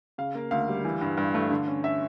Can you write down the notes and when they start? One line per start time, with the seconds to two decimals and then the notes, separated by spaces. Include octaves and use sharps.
0.18 C#3 F5
0.35 A#3
0.51 D2 F5
0.68 G3
0.85 E3
1.01 G2
1.17 G2
1.34 A3
1.51 D3
1.67 C#4
1.84 E5